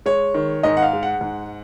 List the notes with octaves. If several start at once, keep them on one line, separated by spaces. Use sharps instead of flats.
G#3 C#5
D#3
G#2 D#5
F#5
F5
G#3
F#5
G#2